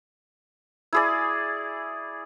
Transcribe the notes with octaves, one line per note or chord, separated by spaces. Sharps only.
E4 G#4 D5